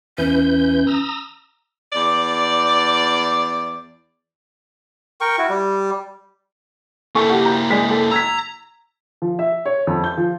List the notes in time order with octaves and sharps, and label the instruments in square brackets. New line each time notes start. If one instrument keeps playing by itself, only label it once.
[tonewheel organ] E2 E3 G6 [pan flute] C#4
[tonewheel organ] A#5 D#6 E6
[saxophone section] E2 D5
[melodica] A#4 G5 C#6
E4 F#4
G3
[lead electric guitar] A#3 E4 [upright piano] A4 C#6
[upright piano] F#4 G4
A#5 G6
G#3 D5 B6
A4
[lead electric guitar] A#5 [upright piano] E6 G#6 B6
[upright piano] F3
E5
C#5
F2
G6
F3